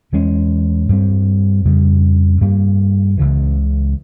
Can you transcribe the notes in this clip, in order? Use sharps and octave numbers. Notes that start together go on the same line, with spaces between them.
E2 E3 G#3 C#4
G2 G3 C4
F2 C#3 G3
G2 G3 A#3
C#2 C#3 E3